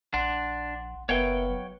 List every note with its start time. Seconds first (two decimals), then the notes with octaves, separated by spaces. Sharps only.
0.14 A#1 D4 F#5 C6
1.09 F#1 B3 A#4 B4 C#5 E5 F#5 G5
1.50 F#3